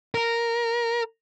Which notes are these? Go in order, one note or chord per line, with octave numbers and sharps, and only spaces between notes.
A#4